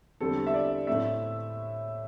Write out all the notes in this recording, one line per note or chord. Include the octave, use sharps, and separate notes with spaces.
E2 D3 G3 C4 A4
E5
D5
A2 A3 C4 E5